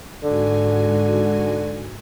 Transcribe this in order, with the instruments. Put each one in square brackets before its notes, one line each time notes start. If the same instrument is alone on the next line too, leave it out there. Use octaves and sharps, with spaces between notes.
[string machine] G#2 F#4 G#5 [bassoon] D3